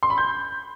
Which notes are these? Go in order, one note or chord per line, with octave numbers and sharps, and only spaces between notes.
C6
B5
G6